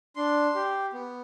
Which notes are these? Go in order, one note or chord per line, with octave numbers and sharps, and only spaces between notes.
D4 C6
G4
B3